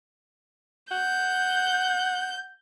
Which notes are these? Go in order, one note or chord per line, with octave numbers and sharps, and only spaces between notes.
F#5 G6